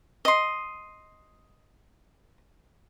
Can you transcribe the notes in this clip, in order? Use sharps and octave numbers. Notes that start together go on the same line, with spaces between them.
D#5 C6